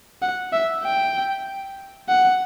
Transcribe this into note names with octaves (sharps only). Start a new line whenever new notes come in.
F#5
E5
G5
F#5